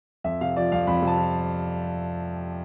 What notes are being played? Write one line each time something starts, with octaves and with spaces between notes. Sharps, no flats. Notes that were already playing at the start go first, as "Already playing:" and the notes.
F2 E5
C3 F5
F3 D5
F2 F5
F2 B5
C3
A5
F3